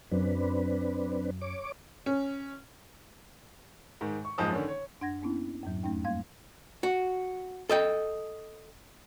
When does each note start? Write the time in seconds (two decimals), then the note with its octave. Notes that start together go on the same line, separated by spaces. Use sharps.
0.11 F#2 C4 D4 B4
1.41 C#5 D6
2.06 C#4
4.01 G#2 D#3
4.25 C#6
4.38 F#1 G#2 F3 D#5 A5 D#6
4.52 D3 D#3 C#4
4.68 C#5
5.01 F#2 D4 F#5 G#6 A#6
5.22 A#3 B3 C#4 D4 E4
5.63 F2 G#2 F#3
5.83 E2 A3 C#4 D#4 G5
6.04 G2 G3 A#3 F5 C6 G#6
6.83 F#4
7.69 A4 D#5 G5